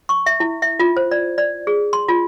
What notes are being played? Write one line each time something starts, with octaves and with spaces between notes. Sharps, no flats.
C#6
E5
E4
E5
F4
C5
D5
D5
G#4
C6
F4